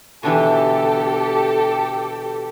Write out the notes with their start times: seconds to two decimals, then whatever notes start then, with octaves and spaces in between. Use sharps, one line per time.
0.23 B2 D3 E3 G4 A4